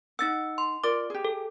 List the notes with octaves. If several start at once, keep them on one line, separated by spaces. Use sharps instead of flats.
D#4 F#5 E6 A6
C6
F4 A#4 D5 D6
G4 G#4
A4